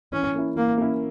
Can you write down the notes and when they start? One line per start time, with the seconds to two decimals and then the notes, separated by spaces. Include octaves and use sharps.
0.13 E3 C#4
0.34 A#3 C#4 E4
0.56 E3 A#3
0.78 A#3 C#4 E4